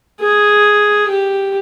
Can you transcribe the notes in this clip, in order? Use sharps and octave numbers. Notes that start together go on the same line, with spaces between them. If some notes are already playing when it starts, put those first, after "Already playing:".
G#4
G4